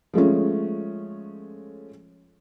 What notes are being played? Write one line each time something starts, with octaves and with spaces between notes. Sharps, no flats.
F3 G#3 A3 C#4